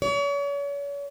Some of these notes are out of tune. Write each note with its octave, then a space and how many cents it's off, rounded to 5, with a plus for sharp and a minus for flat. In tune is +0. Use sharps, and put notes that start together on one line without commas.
C#5 +40